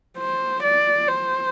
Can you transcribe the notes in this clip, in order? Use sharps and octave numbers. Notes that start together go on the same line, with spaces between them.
C5
D5
C5